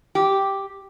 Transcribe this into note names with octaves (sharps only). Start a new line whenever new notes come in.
G4